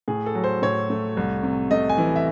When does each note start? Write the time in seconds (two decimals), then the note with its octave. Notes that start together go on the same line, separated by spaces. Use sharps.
0.08 A2 G#4
0.26 A4
0.35 F#3
0.44 C5
0.62 A2 C#5
0.90 A3
1.17 C2
1.43 C3
1.71 A3 D#5
1.89 G#5
1.98 E3
2.16 E5